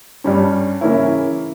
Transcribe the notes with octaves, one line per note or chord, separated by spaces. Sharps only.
G2 G3 C#4
C#3 E3 A#3 C#4 E4